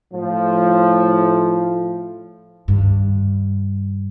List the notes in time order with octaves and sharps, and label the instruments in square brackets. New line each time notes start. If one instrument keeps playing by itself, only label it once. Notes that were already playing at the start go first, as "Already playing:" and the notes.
[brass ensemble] A2 F3
[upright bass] G2 D#3